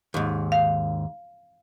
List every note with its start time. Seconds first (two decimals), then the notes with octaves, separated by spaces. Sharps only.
0.14 D#2 G#2
0.52 F5